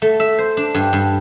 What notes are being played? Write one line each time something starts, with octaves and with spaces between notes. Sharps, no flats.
A3
E5
C5
D4
G2
G2